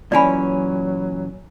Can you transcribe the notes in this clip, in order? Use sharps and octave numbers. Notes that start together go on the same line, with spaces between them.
A#2 E3 F#3 C#4 D5 G#5 B5